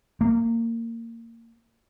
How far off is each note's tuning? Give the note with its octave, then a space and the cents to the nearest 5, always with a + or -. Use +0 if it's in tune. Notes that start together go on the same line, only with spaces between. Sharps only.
A#3 -20